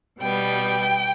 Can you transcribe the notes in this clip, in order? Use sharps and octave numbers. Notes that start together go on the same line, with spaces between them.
B2 G3 B3 G5